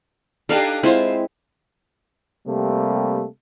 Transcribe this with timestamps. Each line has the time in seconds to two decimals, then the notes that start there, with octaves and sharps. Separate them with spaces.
0.49 D4 D#4 G4 A4 F5 G#5
0.83 G#3 C4 E4 F4 C5
2.47 C3 G3 A3 A#3